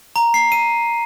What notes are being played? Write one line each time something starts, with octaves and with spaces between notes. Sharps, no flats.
A#5
C7
D#7